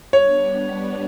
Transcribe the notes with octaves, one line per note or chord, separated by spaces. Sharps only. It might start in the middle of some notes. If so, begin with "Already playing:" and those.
G3 B3 D4 C#5